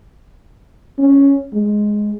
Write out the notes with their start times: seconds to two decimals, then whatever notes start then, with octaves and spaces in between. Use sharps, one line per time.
0.99 C#4
1.54 G#3